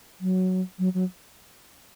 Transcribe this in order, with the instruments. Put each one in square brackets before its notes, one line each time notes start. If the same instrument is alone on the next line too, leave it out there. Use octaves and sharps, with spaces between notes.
[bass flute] F#3
F#3
F#3